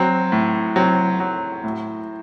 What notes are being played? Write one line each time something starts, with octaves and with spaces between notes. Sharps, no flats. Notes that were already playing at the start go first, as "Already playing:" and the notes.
Already playing: F#3 C4
A2
F#3 C4
F#3
A2